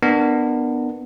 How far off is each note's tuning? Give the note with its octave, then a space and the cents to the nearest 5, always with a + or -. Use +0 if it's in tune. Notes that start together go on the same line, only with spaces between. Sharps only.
B3 +0 D4 +25 A#4 +0